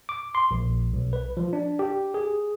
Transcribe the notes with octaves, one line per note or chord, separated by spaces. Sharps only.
D6
C6
A#1
B1
B4
F3
D4
G4
G#4